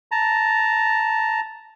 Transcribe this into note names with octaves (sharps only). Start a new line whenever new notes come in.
A5 A#5